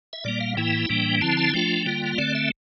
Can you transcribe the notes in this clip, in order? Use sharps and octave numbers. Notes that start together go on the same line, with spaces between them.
E5
A#2 G3 A#3 D5
F5
A2 E3 A#3 E4 G5
A2 E3 G3 A#3 D4
D3 F3 C4 E4 A5
A5
F3 A3 D4 F4 G5
D3 G3 A#3 F4
D3 A3 C4 D5
E5